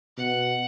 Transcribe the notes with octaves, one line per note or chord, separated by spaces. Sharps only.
B2 F#5